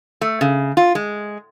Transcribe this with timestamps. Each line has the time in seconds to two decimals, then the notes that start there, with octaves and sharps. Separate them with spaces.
0.21 A3
0.41 C#3
0.77 F4
0.95 G#3